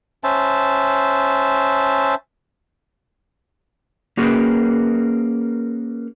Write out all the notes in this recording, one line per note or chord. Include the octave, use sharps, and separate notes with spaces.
C#4 C5 E5 A5
A#3 C#4 F#4 G#4 A#4 B4